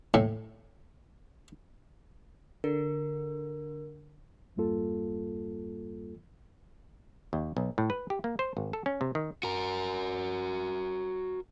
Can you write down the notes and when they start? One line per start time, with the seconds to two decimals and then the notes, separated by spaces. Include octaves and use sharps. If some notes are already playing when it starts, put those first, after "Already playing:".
0.14 A2
2.64 D3 A#4
4.56 E2 G2 G3 A#3 F4 A4
7.33 D#2
7.57 B1
7.78 A2
7.90 B4
8.10 G4
8.24 A#3
8.39 C5
8.57 G#1
8.73 A4
8.86 C#4
9.01 C3
9.15 D#3
9.43 F#4 A#4